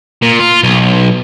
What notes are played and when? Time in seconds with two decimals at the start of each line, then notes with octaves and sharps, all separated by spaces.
0.22 A#2
0.40 F4
0.63 B1